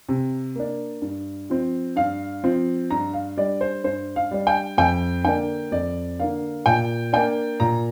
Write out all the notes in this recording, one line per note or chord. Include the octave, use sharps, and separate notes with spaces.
C3
A#3 D4
G2
F3 C4
G2 F5
F3 C4
G2 A#5
F5
G3 D4 D5
C5
G2 C5
F5
G3 D4
G5
F2 G5
D3 A#3 D4 G5
F2 D5
D3 A#3 D4 F5
A#2 G5
A#3 D4 G5
A#2 A#5